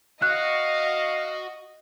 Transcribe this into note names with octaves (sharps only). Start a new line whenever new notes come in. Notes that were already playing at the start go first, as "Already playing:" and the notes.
F#4 D#5 F5 F#6